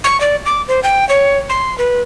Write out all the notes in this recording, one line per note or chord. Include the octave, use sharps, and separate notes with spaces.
C#6
D5
D6
C5
G5
C#5
C6
B4